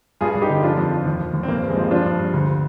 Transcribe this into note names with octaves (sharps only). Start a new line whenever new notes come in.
G2 F4 G#4
G2
D#4 G4
D3
F3 D4 F4
F2
F3
D#2
F3
D#2
C4
G2 A#3
G2
G#3 C4
F3
F3 D4 F4
G2
G2
D2